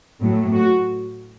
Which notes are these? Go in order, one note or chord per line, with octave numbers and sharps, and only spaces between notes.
A2 F#3 A3
F#4